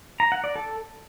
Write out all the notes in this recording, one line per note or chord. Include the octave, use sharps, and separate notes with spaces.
A#5
F#5
D5
A4